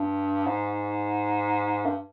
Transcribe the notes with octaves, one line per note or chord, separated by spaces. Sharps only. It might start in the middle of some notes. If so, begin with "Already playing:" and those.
Already playing: G2
G#2
G2